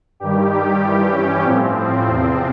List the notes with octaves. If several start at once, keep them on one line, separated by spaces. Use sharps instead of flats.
G2 D#3 G3 G4
G2 E3 G3 G4
C#4
A2 F3 C4
E2 C3 F3 C4